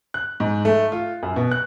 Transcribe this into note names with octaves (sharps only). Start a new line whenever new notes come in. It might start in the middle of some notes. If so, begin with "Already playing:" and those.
F#6
G#2
A3
F4
F#2
B2
F#6